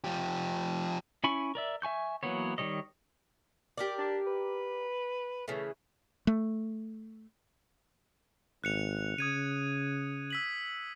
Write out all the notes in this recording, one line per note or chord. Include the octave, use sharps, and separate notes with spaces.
F3 G4
C#4 E4 G#5 B5 C#6
A#4 D5 E5
E5 G#5 C#6 G6
E3 F#3 A#3 B3 C#5
D#3 F3 G3 C#5 D#5
G4 A#4 D5
D4
B4
C#3 E3 A3
A3
G#1 F#6 C#7 F7
C#3 D#6 G#6 D#7
E6 B6 F#7